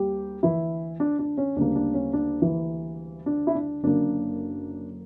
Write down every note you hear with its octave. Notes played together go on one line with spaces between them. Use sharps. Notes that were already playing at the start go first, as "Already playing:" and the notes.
Already playing: D2 G3 A#3 G4
E3 E4
D4
D4
C#4
D2 C#3 G3 A#3 D4
D4
C#4
D4
E3 E4
D4
E4
D4
F#1 F#2 D3 A#3 D4